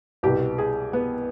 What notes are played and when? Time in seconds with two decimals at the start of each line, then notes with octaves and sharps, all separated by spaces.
0.23 C2 B2 G4
0.58 G#4
0.93 B3